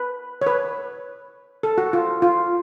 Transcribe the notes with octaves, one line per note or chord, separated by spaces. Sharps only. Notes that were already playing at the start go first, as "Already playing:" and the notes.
Already playing: B4
C#5
B4
A4
F#4
F4
F4